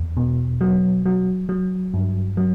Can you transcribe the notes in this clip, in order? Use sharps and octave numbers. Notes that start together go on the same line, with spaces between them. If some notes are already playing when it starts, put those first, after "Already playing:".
Already playing: E2
B2
F#3
F#3
F#3
G2
F#3